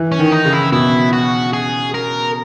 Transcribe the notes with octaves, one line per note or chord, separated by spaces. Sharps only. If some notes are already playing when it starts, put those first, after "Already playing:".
Already playing: E3
C#4
D#3
D#4
C#3
E4
B2 E4
F#4
G#4
A#4